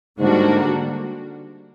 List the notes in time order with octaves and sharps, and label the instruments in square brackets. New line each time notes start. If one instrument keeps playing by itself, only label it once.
[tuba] G#2 [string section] D3 G3 A#3 D4 F#4